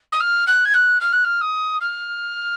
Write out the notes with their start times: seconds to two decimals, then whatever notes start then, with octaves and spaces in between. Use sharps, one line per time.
0.12 D#6
0.20 F6
0.47 F#6
0.65 G#6
0.74 F#6
1.00 F6
1.12 F#6
1.24 F6
1.41 D#6
1.81 F6